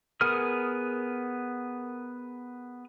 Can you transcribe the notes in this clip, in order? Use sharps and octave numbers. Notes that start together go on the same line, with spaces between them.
B3 G#4 A#4 D#6 F6